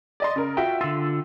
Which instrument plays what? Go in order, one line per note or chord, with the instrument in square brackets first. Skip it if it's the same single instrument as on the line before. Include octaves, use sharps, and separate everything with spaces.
[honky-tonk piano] D5 D#5 C6
C#3 A#4
[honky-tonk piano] F4 F#4 E5 [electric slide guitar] G5
[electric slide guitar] D3 F4 [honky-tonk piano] E6